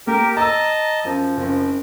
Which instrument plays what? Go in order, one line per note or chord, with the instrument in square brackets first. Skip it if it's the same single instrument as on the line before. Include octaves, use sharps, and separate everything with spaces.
[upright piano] A#3 [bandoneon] G4 A#4
[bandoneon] D#5 A5 [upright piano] A#5 E6
[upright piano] F#2 [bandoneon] F3
[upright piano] F#1 C4